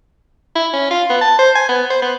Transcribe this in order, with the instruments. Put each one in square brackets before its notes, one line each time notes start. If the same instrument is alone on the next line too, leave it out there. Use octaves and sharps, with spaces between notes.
[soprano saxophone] E4
C#4
F4
B3
A5
C5
G#5
B3
C5
B3